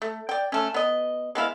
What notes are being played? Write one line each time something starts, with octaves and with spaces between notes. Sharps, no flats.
A3
D5 G5
A3 C#4
B3 D#5
G#3 B3 E4 F5